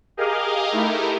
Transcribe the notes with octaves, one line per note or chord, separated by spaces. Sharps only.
G4 G#4 A#4 D#5 F5
A3 D#4 E4 G4 A#4